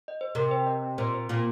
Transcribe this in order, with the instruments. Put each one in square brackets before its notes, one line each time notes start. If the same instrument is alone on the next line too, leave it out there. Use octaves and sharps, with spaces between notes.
[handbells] D#5
C5
[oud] C3 [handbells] A#4
[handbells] C5
D#5
[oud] A#2 [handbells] C5
[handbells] C5
[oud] A#2 A#3 [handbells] F4